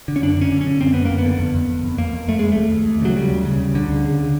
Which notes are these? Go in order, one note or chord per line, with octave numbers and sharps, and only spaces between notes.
D3
C#4
F#2 D4
D3 C#4
D3
C#4
D3
F#2 C4
F#2 B3
A#3
F#2
B3
D3
F2
F2
F2
F2
F2 A#3
F2
F2 A3
F2 G#3
D#2 A3
D#2
D#2
C#3 F#3
C#3 G3
D#2
C#3
C#3
D2 D3
C#3
C#3
C#3